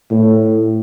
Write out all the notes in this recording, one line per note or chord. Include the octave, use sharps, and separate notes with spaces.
A2